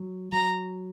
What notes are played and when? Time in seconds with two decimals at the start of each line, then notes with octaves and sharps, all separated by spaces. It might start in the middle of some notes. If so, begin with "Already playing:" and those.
Already playing: F#3
0.32 F#3 A#5